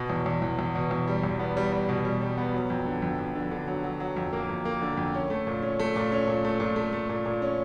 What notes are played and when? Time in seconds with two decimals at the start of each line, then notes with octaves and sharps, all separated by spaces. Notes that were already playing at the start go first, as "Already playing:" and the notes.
Already playing: B2
0.10 E2
0.26 E2
0.42 E2
0.59 E2
0.75 B2
0.91 E2
1.07 G3
1.23 E2
1.40 B3
1.57 G3
1.73 G3
1.89 B2
2.05 G3
2.21 G3
2.38 B3
2.54 F#3
2.70 F2
2.86 D3
3.02 F2
3.19 F2
3.35 D3
3.51 D3
3.68 F#3
3.84 F#3
4.00 F#3
4.17 F2
4.33 A#3
4.49 F2
4.65 A#3
4.82 D3
4.98 F2
5.14 C#4
5.30 A3
5.47 A#2
5.62 C#4
5.80 A3
5.96 A#2
6.12 C#4
6.28 A#2
6.45 A3
6.60 A#2
6.76 A3
6.93 A3
7.09 A#2
7.26 A#2
7.42 C#4